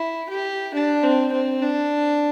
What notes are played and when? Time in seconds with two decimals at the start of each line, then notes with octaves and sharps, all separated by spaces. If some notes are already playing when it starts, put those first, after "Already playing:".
Already playing: E4
0.30 G4
0.74 D4
1.03 C4
1.32 C4
1.62 D4